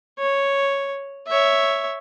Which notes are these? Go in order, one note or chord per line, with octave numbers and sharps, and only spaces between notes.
C#5
C#5 E5